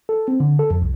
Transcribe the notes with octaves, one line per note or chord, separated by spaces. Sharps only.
A4
C4
D3
A4
F2
C2